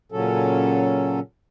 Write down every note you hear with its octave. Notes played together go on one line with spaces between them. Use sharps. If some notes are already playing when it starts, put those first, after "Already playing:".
A#2 C#3 F#3 C#4 A4